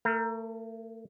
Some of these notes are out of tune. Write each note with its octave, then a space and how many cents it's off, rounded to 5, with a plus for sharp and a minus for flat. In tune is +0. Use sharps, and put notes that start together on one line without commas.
A3 +35 A#4 +0